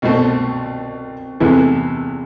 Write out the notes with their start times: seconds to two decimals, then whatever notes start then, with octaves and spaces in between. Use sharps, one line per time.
0.02 C2 B2 A3 C4
1.40 E2 C3 E3 A3 E4